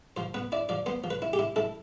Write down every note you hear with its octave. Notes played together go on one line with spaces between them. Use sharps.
F3 C5
B3 B4
E4 D5
F3 D5
B3 C5
F3
B4
E4
G4
E4
E4 A4